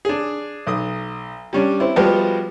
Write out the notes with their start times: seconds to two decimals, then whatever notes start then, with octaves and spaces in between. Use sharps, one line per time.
0.05 D4 G#4
0.67 B1 D#6
1.53 G3 C#4 D4
1.80 C4 E4
1.96 F3 G3 G#3 B3 F#4 G4